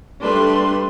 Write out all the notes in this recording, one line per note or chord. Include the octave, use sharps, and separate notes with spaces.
G3 A3 D4 B4 C6